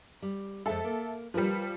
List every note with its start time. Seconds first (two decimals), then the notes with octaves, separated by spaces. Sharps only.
0.22 G3
0.66 F2 G#3 A4 E5
0.84 A#3
1.34 F3 G3 G4 A#4 B4